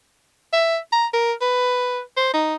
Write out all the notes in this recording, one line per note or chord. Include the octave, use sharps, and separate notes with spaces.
E5
A#5
A#4
B4
C5
D#4